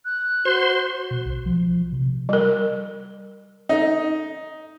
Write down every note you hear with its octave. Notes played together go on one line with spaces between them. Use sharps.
F#6
F#4 C5 C6
B2
B1
F3
C3
G3 A#4
D#4